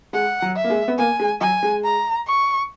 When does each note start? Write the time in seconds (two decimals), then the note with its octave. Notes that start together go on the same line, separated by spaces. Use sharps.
0.13 G#3 F#5
0.42 F#3
0.56 E5
0.64 A#3
0.70 G#3
0.88 B3
0.98 A#3 G#5
1.20 G#3
1.40 F#3 G#5
1.63 G#3
1.84 A#5
2.26 C#6